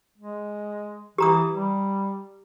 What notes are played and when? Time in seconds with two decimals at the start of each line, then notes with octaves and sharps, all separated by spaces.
0.18 G#3
1.18 E3 G4 A#5 D#6
1.52 G3